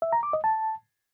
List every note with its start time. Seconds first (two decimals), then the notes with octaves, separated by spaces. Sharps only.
0.02 E5
0.13 A#5
0.23 D6
0.33 D#5
0.44 A5